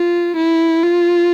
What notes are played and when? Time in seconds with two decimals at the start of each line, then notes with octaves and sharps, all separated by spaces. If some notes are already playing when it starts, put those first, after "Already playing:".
Already playing: F4
0.37 E4
0.83 F4